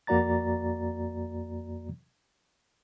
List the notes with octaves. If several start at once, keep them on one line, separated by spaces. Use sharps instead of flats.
F2 A#3 F#4 D5 A#5 A6